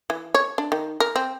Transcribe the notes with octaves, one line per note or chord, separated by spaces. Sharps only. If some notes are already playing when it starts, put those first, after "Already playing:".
E3
C#5
D4
D#3
A#4
C4